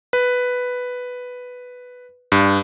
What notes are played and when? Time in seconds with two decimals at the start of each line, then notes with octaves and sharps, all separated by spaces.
0.13 B4
2.32 G2